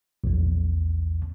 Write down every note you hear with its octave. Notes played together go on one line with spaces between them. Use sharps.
A#1 E2